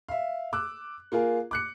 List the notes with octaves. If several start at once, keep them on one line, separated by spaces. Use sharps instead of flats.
E5 F5
D6 E6 F#6
A#3 F4 G#4 A#4
D6 F#6 C#7